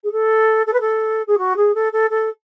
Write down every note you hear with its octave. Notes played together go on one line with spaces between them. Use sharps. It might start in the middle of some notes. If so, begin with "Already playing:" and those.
G#4
A4
A4
B4
A4
G#4
F#4
G#4
A4
A4
A4